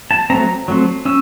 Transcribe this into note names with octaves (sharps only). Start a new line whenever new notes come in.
A5
F#3 A3 C4 A#5
F#3 A3 C4
C#4 E6